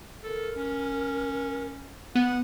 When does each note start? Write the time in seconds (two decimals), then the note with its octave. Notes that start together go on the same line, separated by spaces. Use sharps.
0.23 A4 A#4
0.56 C#4
2.15 B3 F#5 D#7